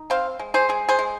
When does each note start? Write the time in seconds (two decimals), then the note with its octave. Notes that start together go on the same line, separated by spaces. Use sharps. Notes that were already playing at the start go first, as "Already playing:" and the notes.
Already playing: D#4
0.10 C4 C5 F5
0.39 G#3
0.54 G#4 C5
0.69 G#3 G#4
0.89 G#4 C5
0.99 G#3